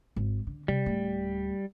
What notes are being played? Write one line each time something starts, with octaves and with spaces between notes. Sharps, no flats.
G#1
D3
C3 G3
D1 A3